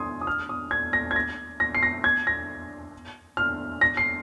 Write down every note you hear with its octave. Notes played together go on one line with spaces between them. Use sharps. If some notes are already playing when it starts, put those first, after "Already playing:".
Already playing: C6 D#6 G#6
D#6
F6
D#6
G#6
A#6
G#6
A#6
A#6
C7
A#6
G#6
A#6
F6
A#6
C7